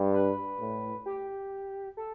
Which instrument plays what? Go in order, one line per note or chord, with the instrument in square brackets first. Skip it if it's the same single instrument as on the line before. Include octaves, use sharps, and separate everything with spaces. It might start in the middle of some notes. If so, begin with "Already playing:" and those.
Already playing: [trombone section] G2
[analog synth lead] B4
[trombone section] A2
[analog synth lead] G4
A4